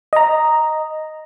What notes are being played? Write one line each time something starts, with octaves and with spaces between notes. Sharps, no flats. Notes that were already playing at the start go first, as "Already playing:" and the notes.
D#5 A#5